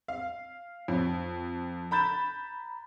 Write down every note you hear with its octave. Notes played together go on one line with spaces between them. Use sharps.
F5
F2
A#5 B5 G6 A6 E7